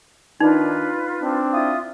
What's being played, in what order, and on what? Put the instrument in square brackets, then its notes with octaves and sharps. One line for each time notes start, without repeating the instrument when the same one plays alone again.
[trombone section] D#3 D4 [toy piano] D#4 [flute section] F4 B4
[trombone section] C4 D4
[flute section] E4 F4 D#6